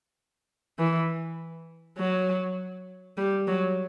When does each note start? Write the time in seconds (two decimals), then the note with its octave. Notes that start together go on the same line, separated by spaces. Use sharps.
0.79 E3
1.98 F#3
3.17 G3
3.47 F#3